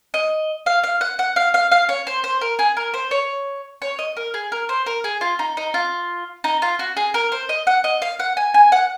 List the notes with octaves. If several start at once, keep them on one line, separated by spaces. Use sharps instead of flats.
D#5
F5
F5
F#5
F#5
F5
F5
F5
C#5
C5
C5
A#4
G#4
A#4
C5
C#5
C#5
D#5
A#4
G#4
A#4
C5
A#4
G#4
F4
D#4
D#4
F4
D#4
F4
F#4
G#4
A#4
C5
D#5
F#5
D#5
F5
F#5
G#5
G#5
F#5